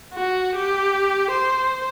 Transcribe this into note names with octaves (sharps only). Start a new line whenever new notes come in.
F#4
G4
C5